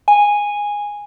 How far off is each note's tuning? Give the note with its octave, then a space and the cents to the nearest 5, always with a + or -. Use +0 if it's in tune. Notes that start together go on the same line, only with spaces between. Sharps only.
G#5 -10